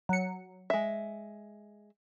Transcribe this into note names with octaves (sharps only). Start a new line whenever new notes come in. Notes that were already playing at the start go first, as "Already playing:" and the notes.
F#3 C#7
G#3 E5